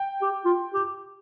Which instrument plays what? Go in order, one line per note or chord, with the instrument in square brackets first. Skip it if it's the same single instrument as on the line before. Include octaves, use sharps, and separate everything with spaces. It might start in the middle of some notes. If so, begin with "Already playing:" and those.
Already playing: [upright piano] G5
[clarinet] G4
F4
G4